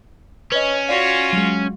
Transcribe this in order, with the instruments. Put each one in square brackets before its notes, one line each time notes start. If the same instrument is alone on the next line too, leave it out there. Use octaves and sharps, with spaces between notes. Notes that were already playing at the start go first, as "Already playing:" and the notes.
[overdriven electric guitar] C#4 [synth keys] B4 C#5 D#5
[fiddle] F4 F#4 [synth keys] D5 F5
[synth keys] F#3 G#3